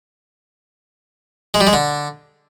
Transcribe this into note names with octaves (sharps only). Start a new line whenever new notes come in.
G#3
G3
G#3
D3